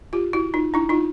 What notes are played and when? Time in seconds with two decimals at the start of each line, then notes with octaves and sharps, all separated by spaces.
0.13 F4 G4
0.33 E4 F#4
0.54 D#4 F4
0.74 D4 E4
0.89 D#4 F4